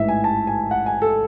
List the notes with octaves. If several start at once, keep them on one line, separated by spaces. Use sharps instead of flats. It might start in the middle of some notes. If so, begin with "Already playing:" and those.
Already playing: A1 G#2 E3 E5
G#5
A5
G#5
F#5
G#5
A4